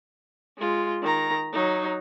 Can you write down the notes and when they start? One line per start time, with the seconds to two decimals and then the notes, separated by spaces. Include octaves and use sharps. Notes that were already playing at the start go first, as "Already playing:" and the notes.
0.58 G#3 F4
1.02 D#3 A#5
1.53 F#3 D#4